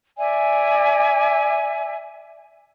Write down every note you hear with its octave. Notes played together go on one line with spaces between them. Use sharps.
D5 E5 G#5